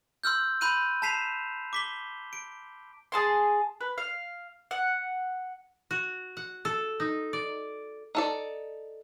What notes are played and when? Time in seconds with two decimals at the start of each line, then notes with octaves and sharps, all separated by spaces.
0.24 C6 E6 F6 G6
0.61 B5 C6 F#6 G6 D#7
1.02 A5 A#5 B6 C7 E7 F7
1.73 D6 B6 G7
2.33 D7
3.12 G#4 A5 C6
3.81 B4
3.98 F5
4.71 F#5
5.91 F#4
6.37 F#5
6.65 A4
7.00 D#4
7.33 D5
8.15 D#4 A4 D5